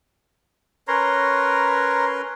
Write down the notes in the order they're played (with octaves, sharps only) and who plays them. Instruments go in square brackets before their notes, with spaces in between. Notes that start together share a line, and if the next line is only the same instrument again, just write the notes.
[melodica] C#4 A#4 B4 [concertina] C#5 A#5 C6